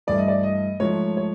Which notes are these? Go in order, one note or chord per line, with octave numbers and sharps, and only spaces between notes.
G2 E3 A3 D5
D#5
D5
D#5
G#2 F3 A3 C#5
C#5